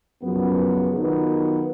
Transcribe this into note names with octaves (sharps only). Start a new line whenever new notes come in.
F#2 C#3 F3 B3
D#3 F#3 B3 F4